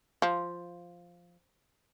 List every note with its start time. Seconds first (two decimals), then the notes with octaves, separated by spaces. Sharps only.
0.22 F3